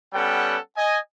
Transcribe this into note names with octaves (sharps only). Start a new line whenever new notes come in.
G3 B3 C#4 A4 F#5 G5
D#5 G#5